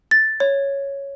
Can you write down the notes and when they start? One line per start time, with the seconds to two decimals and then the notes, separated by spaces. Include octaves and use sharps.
0.11 A6
0.40 C#5